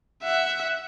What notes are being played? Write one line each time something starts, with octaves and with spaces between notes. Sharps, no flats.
E5 F#5